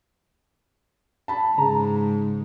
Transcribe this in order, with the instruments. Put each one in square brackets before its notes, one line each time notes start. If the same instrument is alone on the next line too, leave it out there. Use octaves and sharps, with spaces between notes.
[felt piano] A5 B5
[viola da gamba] G#2 [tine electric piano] C#3 [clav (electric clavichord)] A#5